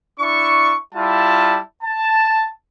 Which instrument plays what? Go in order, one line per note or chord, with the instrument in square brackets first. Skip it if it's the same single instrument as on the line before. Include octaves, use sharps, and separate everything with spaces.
[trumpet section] D4 E4 C#6
G3 E4 F4 A5
A5